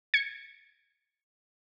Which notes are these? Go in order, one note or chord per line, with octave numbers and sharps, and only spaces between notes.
G#6 C#7